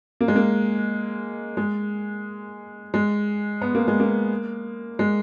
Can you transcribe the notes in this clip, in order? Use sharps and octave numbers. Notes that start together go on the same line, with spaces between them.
A#3
G#3
A#3
G#3
G#3
B3
A#3
G#3
A#3
G#3